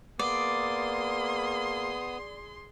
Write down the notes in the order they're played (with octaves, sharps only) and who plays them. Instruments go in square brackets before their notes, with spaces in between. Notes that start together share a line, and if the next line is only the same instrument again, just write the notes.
[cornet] A#3 [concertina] B3 D#6 [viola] G#4 C6 [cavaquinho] D5